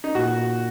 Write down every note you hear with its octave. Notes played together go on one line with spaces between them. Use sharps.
D#4
A#2 F#4